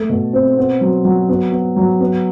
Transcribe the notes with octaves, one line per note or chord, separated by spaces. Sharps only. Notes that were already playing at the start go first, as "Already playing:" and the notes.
Already playing: A3
B2
C4
B3
F#3
F#3
B3
B3
F#3
B3